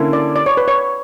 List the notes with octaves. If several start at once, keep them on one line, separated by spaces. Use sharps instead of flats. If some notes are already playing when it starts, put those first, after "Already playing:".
Already playing: D3 A#3 C#4 E4
D5
D5
C#5
B4
C#5